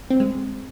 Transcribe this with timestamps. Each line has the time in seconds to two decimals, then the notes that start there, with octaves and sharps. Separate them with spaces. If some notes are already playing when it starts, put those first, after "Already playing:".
0.10 C4
0.20 G#3